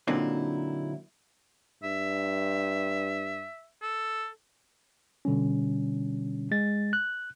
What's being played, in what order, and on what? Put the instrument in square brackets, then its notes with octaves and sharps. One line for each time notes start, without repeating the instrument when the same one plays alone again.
[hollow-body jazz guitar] A#2 D3 F#3 C4 D#4 E4
[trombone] G2 [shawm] E5
[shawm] A4
[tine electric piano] B2 D3 G3 C#4
G#3 A6
F#6